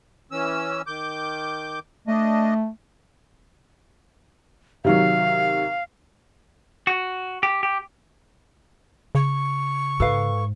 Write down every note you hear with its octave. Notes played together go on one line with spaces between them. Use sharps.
E3 C#4 E6
D#3 D6 G6
A3 D4 D#5
C3 D#3 F#3 F5
F#4
G4
G4
C#3 C#6
G#2 A4 B4 F5